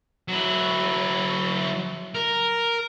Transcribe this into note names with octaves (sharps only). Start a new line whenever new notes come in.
F#3 E4
A#4